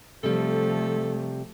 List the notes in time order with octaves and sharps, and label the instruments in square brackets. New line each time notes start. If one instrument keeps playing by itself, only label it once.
[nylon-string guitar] C3 G3 [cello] F3 A3 [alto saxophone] A4